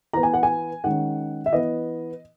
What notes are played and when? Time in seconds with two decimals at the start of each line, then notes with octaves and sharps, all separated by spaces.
0.13 E3 B3 A#5
0.23 G#5
0.33 F#5
0.43 G#5
0.84 D#3 G#3 C#4 F#5
1.46 E5
1.53 E3 B3 D#5